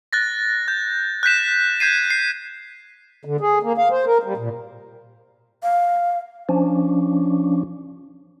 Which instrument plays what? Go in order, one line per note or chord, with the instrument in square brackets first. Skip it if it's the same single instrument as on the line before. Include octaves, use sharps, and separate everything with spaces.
[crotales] F#6 A6 A#6
G6
F#6 G6 B6 E7
G6 G#6 C7 D#7
C7
[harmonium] D3
G#4
A#3
F5
C5
A#4
G3
A#2
[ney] F5
[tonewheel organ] F3 C#4 D4